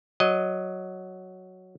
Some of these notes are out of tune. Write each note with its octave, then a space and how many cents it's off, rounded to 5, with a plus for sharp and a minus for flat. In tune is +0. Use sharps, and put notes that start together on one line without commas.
F#3 +0 D#5 +0